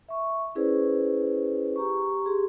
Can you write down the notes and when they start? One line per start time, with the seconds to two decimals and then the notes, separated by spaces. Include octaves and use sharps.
0.09 E5 C#6
0.55 C#4 E4 G#4 B4 C5 D5
1.76 G4 A#5 C#6
2.25 G4 G#4 C6